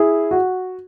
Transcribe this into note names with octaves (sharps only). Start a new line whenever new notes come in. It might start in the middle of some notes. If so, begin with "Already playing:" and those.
Already playing: E4 G#4
F#4